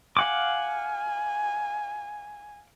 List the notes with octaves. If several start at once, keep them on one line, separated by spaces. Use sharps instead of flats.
F5 F#5 G#5 D6